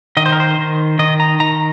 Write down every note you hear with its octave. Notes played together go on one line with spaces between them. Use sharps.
D#3 D#5
C5
A#4
C5
D#3
D#3 D#5
A#5
D#3 A#5